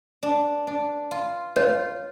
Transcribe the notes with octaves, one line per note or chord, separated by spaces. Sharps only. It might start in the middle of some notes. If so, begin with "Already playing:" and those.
D4
D4
F4
F4 C#5